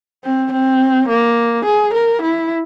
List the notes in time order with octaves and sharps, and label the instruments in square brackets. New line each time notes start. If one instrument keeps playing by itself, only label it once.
[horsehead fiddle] C4
C4
A#3
G#4
A#4
E4